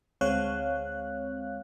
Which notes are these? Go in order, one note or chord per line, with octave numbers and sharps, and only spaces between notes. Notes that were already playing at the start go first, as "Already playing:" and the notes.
D2 G#3 C4 C#5 F5 F#6